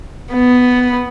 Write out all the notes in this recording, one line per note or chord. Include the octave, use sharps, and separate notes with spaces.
B3